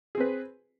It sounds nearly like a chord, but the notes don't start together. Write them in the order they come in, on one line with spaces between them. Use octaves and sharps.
G#4 C4 B4